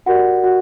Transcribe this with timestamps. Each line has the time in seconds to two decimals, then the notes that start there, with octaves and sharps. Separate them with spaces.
0.06 F#4 G4 A#4 D5 F#5
0.44 F#4 F#5